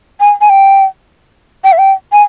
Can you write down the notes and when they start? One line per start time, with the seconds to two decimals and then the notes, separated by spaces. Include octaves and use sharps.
0.20 G#5
0.41 G#5
0.49 G5
1.64 G5
1.72 E5
1.78 G5
2.12 G#5